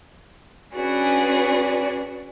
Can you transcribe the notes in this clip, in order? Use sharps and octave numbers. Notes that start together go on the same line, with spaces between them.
C#4 D4 F#4 G#4 B4